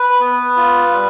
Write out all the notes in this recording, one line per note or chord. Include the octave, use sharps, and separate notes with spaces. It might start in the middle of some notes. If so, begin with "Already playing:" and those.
Already playing: B4
B3
F4
G3